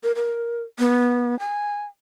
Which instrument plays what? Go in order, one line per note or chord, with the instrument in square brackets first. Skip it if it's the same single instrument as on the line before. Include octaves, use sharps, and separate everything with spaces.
[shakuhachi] A#4
A#4
B3
G#5